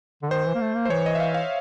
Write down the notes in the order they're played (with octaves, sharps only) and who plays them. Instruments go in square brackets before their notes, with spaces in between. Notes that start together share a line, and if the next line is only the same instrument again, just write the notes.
[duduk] D3
[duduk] D#3 [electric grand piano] C5
[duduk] E3
A#3
A3
A#3
[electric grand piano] C5
[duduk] E3 [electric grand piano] C#5
[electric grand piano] D#5
E5
F5
F5